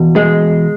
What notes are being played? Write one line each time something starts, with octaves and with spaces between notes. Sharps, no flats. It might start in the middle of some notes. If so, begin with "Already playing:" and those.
Already playing: E2 B2
G#3